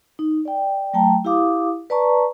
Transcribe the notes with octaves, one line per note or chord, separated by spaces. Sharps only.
D#4
D5 G5
F#3 A3 G5 A5 A#5
E4 G4 F5 D6 D#6
B4 D5 A5 A#5 C#6